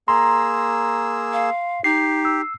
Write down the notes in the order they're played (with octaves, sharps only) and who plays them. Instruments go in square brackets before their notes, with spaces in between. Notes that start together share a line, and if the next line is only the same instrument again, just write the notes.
[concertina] A#3 G#4 E6 [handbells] A#5 [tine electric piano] C6
[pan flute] F5
[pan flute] D#4 [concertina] G4 [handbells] C7
[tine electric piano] E6